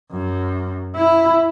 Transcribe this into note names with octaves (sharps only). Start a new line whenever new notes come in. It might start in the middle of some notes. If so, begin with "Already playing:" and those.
F#2
E4